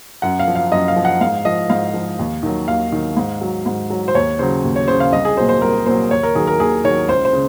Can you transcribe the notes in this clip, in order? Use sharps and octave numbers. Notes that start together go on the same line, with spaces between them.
F#2 F#5
F5
F3
F5
F#2 D#5
F5
F3
F#5
G#2 F5
F3 D#5
G#2 F5
F3
D#2
D#3 F#3
D#2 F5
D#3 F#3
G#2
F#3
G#2
F#3
C5
D#2 C#5
C#3 F#3 C5
D#2
C#5
C#3 F#3 C5
F5
C2 D#5
G#4
A#2 F#3 C5
C5
C2 A#4
A#2 F#3 C5
D#2 C#5
A#4
D#3 F#3 G#4
A#4
D#2 G#4
D#3 F#3 C#5
C#2 C5
C5
C#3